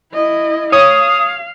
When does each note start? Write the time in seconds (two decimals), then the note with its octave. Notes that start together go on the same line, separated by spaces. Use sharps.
0.12 E4 D#5
0.72 C#5 F5 D#6